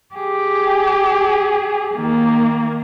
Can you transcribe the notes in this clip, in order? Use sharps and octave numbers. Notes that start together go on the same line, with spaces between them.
G4 G#4
D#3 A#3